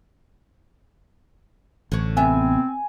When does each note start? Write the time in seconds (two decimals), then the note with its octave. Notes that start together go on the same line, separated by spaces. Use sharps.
1.92 A1 D3 C#5
2.17 C3 B3 C4 E5 G#5